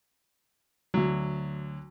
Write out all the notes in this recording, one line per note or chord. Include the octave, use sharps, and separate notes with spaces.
D2 F#3